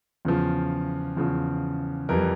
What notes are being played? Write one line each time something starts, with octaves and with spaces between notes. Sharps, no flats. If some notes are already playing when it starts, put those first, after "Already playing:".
E2 C#3 F3
E2 C#3 F3
F2 E3 G3 A#4